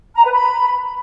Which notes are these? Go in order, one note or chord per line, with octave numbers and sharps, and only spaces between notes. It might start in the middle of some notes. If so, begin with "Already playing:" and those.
A#5
B4
B5